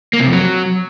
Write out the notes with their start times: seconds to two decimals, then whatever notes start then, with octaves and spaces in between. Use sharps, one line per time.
0.13 A#3
0.20 C3
0.26 F2
0.33 F#3